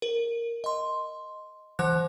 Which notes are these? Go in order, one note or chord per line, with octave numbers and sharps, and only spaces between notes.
A#4
D#5 C6
E3 C5 F#5 F#6